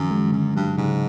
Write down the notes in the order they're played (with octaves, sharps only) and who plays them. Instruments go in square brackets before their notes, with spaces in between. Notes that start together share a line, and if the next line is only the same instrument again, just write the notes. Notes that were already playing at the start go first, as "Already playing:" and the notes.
Already playing: [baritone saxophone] F#2 [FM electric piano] D#3 F3
[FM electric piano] G#3
[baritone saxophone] F#2 [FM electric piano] D3
[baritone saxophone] G2 [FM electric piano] F#3
[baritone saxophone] G#2 [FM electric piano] C#3